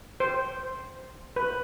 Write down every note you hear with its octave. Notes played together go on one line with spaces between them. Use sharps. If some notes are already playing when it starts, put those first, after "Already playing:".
C5
B4